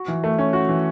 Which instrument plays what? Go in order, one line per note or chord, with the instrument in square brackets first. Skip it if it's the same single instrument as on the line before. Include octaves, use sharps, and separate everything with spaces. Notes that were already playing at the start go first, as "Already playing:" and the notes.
Already playing: [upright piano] F#4
E3
A3
C#4
F#4
E3